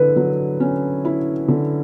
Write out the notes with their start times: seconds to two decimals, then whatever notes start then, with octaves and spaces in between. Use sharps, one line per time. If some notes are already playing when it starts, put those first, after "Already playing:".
Already playing: D3 E4 B4
0.16 F#3
0.60 C#4
1.05 E4
1.48 D3